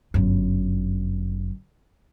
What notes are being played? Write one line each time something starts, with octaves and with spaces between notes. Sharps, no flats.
G1 F#2